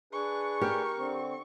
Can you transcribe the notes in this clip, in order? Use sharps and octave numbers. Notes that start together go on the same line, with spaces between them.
D4 G#4 B4 C#6
G4 A#4
D3 C4